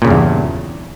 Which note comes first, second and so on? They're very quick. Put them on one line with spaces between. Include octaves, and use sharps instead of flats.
A#2 C#3 G2 E2